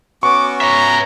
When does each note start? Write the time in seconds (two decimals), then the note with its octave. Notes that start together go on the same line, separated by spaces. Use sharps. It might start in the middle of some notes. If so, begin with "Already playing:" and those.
0.23 B3 C#4 F#4 C#6 D6
0.61 C#5 E5 A#5